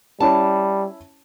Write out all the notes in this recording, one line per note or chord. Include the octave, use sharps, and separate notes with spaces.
G3 C#4 E4 C#5 A5